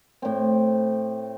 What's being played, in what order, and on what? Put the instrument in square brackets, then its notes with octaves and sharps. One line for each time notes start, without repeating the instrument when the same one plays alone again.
[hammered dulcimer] A2 C4